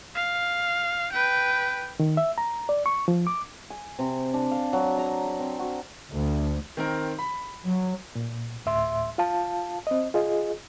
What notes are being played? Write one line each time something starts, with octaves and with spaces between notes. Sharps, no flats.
F5
B4 G5
D#3
E5
A#5
D5
C#6
F3
D6
G#5
C3
D4
F5
F#3
A#5
D6
C4
F#4
D2
D#3 C4 A#4
B5
F#3
A#2
D2 A2 E5 C6
F4 F5 A5
C4 D#5
F4 G#4 D#5